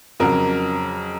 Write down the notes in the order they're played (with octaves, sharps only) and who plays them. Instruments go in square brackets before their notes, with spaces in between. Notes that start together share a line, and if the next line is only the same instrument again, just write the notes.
[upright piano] F2 C#3 F#3 A#4